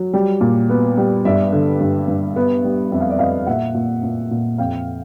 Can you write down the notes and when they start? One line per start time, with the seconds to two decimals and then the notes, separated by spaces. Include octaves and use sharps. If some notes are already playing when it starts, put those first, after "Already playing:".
Already playing: F#3
0.13 G3
0.41 A#2
0.70 B3
0.97 G3
1.25 G2 D5 E5
1.52 D3
1.80 G2
2.08 G2
2.36 B3
2.64 G3
2.92 F2 E5
3.00 F5
3.10 D5 E5
3.19 F2 D#5 F5
3.47 A#2 E5 F#5
3.74 A#2
4.03 A#2
4.31 A#2
4.58 F2 F5 G5